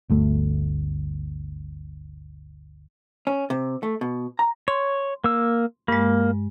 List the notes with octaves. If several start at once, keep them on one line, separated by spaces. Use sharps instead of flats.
G1 D2 A3
C#4
C3
A3
B2
A#5
C#5 C6
A#3 E6
G2 G#3 A#3